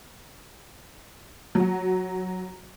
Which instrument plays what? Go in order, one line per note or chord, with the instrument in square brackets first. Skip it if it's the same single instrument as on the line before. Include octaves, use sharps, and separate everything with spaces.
[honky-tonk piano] F#3 F#4